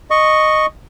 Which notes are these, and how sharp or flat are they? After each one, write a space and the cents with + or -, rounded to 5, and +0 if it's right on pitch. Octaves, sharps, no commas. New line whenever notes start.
D#5 -10 C#6 +0